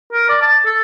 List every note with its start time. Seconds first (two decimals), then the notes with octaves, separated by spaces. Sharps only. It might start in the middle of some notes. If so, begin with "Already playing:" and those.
0.13 A#4
0.29 D5
0.42 A5
0.65 A4